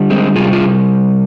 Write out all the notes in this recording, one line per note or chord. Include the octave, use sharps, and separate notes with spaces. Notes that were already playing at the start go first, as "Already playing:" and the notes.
Already playing: D3 G3
G#3 C4
C3 G3 F4 G#4
F4 G#4